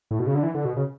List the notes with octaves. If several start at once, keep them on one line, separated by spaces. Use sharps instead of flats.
A2
B2
C#3
D3
E3
D3
B2
C#3